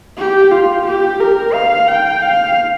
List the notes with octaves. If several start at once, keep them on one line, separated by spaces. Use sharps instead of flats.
G4
F4
G4
A#4
F5
G5
F5